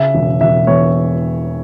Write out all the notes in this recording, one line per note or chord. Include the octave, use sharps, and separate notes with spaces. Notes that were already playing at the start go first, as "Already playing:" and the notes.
Already playing: C#3 E5
E1
E1 E5
E2 C#5